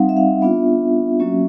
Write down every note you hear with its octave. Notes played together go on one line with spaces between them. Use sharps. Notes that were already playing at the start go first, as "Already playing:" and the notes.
Already playing: G3 C4 D#4 F5 F#5
E5
F5
B3 D4 F4 E5
F#3 A#3 C#4 F#4